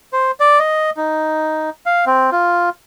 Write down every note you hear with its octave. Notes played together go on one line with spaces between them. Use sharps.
C5
D5
D#5
D#4
F5
C4
F4